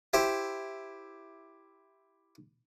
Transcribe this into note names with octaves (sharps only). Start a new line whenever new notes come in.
E4 G4 C5